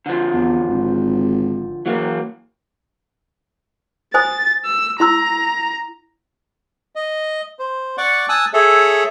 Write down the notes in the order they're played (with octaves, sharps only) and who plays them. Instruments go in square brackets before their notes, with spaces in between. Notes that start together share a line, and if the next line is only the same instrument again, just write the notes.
[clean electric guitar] D3 F3
[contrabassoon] E2
G#1
[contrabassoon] E3 [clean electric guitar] F#3 A#3
[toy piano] C5 G#5 D#6 [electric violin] A6
[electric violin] E6
[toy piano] E4 C6 E6 [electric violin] A#5
[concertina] D#5
C5
D5 F#5 C#6 D6
G#5 A5 D#6 E6 F#6
G#4 A4 C#5 E5